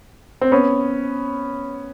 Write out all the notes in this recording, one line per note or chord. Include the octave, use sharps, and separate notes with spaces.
C4
B3 C#4